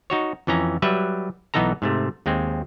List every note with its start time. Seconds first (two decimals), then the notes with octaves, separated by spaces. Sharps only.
0.10 D#4 F#4 C#5
0.47 F2 E3 C#4 A#5
0.82 F#3 G3 B4 E5
1.54 B1 E3 B3 D#4 A4 A#5
1.82 G#2 C3 A3
2.26 D#2 G#3 C4